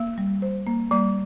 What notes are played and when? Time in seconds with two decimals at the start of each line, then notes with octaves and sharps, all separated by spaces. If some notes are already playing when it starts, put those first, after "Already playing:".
Already playing: A#3
0.18 G3
0.42 C5
0.67 A#3
0.91 G3 A#3